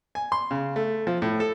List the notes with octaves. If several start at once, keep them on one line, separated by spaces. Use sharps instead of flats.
G#5
C6
C#3
A3
F3
A2
A4